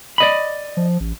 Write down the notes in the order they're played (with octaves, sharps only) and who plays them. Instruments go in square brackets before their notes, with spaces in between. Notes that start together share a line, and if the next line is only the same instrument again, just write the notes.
[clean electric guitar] D5 D#5 B5
[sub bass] F3
A1